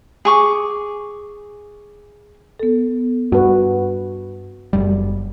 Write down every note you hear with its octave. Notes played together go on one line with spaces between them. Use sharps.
G#4 C#6 D6
B3 A4
G2 F#4 B4
F#1 F#2 G3